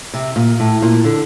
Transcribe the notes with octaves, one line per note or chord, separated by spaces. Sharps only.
C3
A#2
A2
A#2
D3